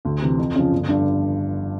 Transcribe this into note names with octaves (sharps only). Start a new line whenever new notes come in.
D2
C3 E3
F2
C#3 F3
G1
G2 D3